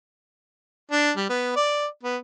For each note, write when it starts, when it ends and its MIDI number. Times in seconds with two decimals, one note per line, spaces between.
0.92 1.11 62
1.17 1.28 55
1.30 1.55 59
1.56 1.86 74
2.03 2.17 59